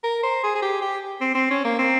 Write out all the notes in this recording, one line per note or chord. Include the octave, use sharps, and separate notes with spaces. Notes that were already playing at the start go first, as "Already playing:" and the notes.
A#4
C5
G#4
G#4
G4
G4
C4
C4
C#4
A#3
C4